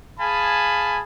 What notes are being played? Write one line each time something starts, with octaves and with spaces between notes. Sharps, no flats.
G#4 F5 G#5 A5 B5